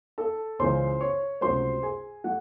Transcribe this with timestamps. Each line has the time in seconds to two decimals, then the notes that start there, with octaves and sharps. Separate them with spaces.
0.18 A4 A5
0.59 C#2 C#3 E3 G#3 C5 C6
1.01 C#5 C#6
1.41 C#2 C3 F#3 A3 C5 C6
1.83 G#4 G#5
2.24 F#3 A3 F#4 F#5